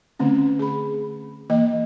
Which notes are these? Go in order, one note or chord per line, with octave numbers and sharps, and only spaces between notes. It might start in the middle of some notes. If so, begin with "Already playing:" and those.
D3 A3 C4 C#4
G#4 B5
E3 A#3 D#5